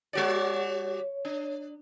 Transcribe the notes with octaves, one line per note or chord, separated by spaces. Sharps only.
G3 F#4 C#5 D5
D4